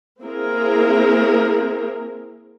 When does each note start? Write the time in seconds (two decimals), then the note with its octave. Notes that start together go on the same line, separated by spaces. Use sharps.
0.22 A#3 C4 E4 G#4 A#4